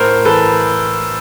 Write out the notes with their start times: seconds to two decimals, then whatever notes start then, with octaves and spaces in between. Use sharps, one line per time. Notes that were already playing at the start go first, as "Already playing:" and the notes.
Already playing: A2 A#4 C5
0.25 E3 A4 B4